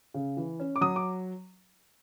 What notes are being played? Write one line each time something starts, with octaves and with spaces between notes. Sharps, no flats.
C#3
E3
C#4
D6
F#3 D#6
D6